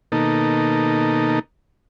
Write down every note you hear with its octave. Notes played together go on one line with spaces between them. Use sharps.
B2 D#3 A#3 D#4 A4